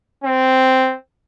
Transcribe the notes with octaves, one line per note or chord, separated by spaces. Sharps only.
C4